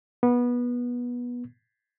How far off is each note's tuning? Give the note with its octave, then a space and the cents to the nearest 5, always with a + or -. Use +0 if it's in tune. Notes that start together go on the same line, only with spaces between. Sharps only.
B3 -20